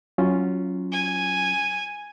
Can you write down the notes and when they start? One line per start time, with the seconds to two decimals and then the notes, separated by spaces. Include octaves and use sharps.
0.18 F#3 C#4 F4
0.92 G#5